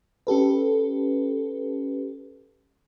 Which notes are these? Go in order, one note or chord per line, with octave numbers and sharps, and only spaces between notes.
C#4 G4 A4 B4